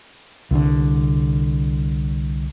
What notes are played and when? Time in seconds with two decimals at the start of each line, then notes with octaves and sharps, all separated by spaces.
0.51 C2 D3